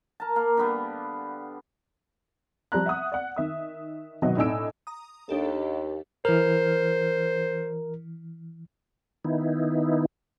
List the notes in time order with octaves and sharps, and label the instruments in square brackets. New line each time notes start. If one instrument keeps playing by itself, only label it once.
[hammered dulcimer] A#4 A5
A#3 F5
D3 G3 B3 G4
[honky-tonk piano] F3 G3 D5 A#5 F#6
E5 F#5 D#6
D5 F#5
D#3 E5 D#6
G#1 B2 F#3 D#5 E5
A2 D4 D#4 G#5 E6 D7
[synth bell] A#5 D#6
[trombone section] D#2 [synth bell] D4 G4 A4
[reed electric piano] E3 F6 [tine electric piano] A#4 [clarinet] C5
[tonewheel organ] D#3 B3 D#4 E4